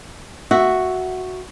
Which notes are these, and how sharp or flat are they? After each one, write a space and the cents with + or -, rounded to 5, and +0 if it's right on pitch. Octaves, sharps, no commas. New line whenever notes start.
F#4 +0 E5 +0